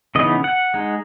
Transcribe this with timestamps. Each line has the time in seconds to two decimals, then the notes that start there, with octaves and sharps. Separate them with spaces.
0.15 C#3 E3 B3 D#4 D#5
0.44 F#5
0.74 G#3 D#4